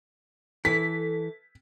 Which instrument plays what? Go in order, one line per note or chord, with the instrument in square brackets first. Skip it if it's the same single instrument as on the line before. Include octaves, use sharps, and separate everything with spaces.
[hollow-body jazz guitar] E3 [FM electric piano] A4 [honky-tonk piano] B6